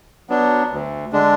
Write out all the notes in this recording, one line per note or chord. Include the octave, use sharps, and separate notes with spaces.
F#3 B3 D4
D2
D3 G#3 D4